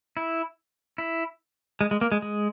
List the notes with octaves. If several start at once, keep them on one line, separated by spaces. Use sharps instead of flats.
E4
E4
G#3
G#3
A#3
G#3
G#3